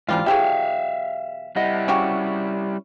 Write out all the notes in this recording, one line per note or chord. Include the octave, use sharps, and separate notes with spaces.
G#2 E3 F3 G3 F4
B2 E3 F#3 G4 G#4 E5 F5
G3 E4 D#5 F#5
C#3 C#4 F#4 G4 F#5